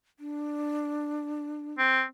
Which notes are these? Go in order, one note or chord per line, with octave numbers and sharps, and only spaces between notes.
D4
C4